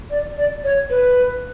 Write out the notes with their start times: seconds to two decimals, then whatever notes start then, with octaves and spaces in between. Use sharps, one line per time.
0.10 D5
0.37 D5
0.64 C#5
0.90 B4